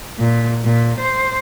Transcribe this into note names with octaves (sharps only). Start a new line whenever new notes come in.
A#2
A#2
C5